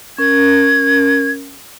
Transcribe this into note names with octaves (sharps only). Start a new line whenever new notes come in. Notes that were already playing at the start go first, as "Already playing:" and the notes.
C#4 A#4 G#6